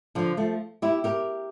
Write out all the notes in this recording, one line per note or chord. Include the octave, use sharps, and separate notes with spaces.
D3 F3
F3 A3
E4 G4
G4 A#4